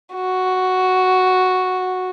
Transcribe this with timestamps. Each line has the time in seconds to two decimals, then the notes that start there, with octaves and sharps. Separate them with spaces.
0.15 F#4